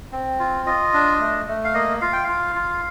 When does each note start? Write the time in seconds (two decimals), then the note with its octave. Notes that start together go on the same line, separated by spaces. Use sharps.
0.12 C4
0.39 F4
0.66 F4 D#5
0.93 D4
1.20 A3
1.48 A3
1.64 F5
1.74 A#3 D#5
2.01 F4 F5
2.13 G5
2.24 F4 F5
2.56 F4